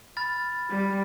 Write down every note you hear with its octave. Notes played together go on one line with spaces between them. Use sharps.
B5 F6 A6
G3